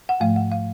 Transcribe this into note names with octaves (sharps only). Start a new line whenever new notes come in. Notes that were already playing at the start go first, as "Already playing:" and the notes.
F#5
G#2 F3 A3 F5
F#5
F5